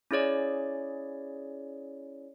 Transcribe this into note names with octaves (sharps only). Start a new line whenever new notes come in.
C#4 E4 G#4 C#5 D5